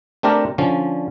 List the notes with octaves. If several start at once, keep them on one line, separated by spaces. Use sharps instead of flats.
A3 C4 D4 G4 A#4 D5
D3 F3 C#4